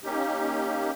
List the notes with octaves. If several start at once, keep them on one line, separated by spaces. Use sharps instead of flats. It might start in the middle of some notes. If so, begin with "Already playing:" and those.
A#3 C#4 D#4 G4